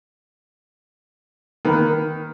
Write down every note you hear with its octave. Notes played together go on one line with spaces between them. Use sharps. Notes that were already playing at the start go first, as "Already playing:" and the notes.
D#3 A#3 A#4 B4